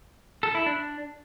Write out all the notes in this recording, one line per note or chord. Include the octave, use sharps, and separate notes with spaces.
A4
E4
D4